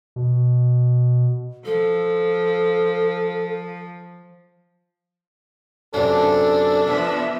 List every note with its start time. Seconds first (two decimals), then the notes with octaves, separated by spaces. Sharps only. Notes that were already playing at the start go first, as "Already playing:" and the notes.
0.16 B2
1.65 F3 A4
5.94 F#2 C3 D4 A4
6.86 F3 B3 E5